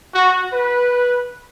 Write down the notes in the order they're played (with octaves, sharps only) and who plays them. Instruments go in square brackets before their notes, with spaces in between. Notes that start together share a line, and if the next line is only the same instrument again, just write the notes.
[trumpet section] F#4
B4